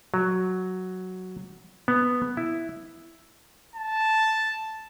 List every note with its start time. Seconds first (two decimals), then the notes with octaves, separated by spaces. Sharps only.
0.14 F#3
1.88 B3
2.37 E4
3.75 A5